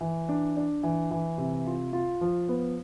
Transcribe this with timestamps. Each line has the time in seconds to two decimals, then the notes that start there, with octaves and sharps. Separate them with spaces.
0.01 E3
0.29 D4
0.57 D4
0.83 E3
1.11 E3
1.38 C3
1.66 F4
1.93 F4
2.21 F3
2.49 B3